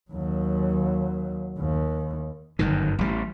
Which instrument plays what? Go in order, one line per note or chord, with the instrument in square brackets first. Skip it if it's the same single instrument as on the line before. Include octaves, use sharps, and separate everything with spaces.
[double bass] D#2 F#3
D#2
[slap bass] G1 F#2 D#3
A1 G3